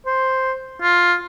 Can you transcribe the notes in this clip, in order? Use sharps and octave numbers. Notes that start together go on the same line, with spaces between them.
C5
F4